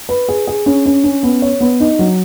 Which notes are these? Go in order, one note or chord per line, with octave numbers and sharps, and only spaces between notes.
B4
G#4
G#4
C#4
C#4
C#4
B3
C#5
B3
D#4
F#3